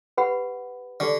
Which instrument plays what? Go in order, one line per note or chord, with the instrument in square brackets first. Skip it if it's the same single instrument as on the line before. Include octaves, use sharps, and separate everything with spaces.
[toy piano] G4 B4 F#5 B5
[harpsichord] D3 [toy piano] D4 G4 D5